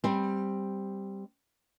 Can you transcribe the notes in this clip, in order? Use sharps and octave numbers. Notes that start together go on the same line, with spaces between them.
G3 C4